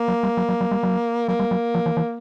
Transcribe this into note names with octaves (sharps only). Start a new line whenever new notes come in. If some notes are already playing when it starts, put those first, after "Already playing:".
Already playing: A#3
F#3
G3
F#3
F#3
F#3
G3
F#3
F#3 A#3
G3
F#3
F3
E3
E3